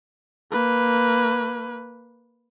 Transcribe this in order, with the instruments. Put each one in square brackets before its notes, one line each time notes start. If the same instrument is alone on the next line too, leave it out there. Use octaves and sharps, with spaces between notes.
[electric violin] A#3 B4